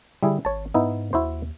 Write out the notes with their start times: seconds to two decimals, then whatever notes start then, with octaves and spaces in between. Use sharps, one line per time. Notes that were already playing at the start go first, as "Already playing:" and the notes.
0.23 D3 G3 E4 G#4
0.45 G#1 C#5 A5
0.74 G#2 B3 D#4 E4
1.13 D#2 E4 F#4 C5